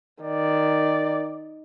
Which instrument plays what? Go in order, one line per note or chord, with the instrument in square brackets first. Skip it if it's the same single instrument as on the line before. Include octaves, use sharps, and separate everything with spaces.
[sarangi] D#3 [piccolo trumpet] D5